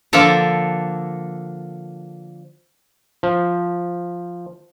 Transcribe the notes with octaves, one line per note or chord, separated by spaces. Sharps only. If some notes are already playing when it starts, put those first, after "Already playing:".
D3 F3 A#3 D4 A4 A#4
F3